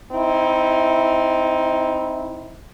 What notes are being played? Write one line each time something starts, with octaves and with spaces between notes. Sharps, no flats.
C4 D#4 E4